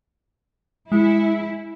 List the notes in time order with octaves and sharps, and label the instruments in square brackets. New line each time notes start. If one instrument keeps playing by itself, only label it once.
[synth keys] G#3 C#7 [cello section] E4